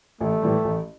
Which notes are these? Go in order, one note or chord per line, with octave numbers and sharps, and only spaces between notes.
A1 A3
A2 E3 G3
A1